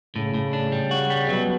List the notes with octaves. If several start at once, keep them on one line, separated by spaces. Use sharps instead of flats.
A2 C#3
A2
D4
G3
F#4
G3
B2 F#3